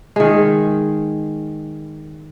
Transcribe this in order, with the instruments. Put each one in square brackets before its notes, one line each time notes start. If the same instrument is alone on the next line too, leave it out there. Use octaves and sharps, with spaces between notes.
[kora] D#3 G#3